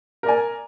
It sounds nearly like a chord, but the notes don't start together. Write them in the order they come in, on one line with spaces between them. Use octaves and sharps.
A#4 D5 G#5